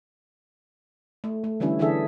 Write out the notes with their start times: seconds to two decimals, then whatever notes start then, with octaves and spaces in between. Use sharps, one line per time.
1.24 A3
1.44 A3
1.60 D3 E3 G3 C#4 E4
1.79 D3 E3 D4 G#4 A4 E5